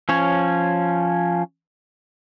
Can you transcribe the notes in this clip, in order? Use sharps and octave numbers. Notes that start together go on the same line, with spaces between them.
F3 C#4 C#5